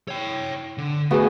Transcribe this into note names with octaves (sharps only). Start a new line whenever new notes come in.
C#5 G5
D3
A3 B3 F#4 G#4